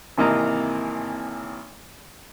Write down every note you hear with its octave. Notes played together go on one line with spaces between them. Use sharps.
G#1 C3 E3 A#3 D#5 A#5